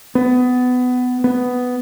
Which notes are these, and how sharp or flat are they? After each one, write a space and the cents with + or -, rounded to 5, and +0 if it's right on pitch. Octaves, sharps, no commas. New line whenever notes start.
B3 +20
B3 +10